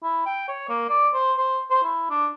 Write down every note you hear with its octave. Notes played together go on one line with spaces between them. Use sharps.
E4
G5
C#5
A#3
D5
C5
C5
C5
E4
D4